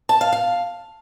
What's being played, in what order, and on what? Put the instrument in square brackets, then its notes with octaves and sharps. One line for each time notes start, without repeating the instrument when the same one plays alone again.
[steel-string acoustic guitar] A5
F5
F5